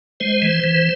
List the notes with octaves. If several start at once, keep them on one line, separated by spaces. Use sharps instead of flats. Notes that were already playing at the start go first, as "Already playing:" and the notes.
G#3 C5
E3
E3